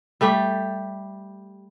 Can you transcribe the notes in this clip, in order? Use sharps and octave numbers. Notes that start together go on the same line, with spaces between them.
G3 A3 G4